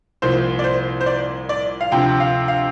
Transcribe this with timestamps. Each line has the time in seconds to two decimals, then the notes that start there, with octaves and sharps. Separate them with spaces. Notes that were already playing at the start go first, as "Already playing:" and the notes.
0.22 C2 A#2 F3 C5
0.59 D5
0.64 C5
1.01 C5
1.06 D5
1.49 D5
1.81 F5
1.92 D2 C3 F3 G5
2.20 F5
2.48 F5